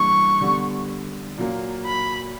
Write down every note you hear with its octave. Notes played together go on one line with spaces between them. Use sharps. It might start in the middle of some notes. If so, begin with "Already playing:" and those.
Already playing: G2 E3 A#3 D4 C#6
D3 G3 B3
A#2 F#3 A#3
B5